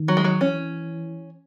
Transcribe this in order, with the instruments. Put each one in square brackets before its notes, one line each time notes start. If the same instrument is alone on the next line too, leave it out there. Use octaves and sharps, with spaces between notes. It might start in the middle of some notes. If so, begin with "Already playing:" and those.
Already playing: [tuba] D#3
[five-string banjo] F#3
G#3
F#3
[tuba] E3 [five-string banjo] C#4